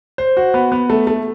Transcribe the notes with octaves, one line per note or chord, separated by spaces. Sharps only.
C5
F#4
B3
B3
A3
A3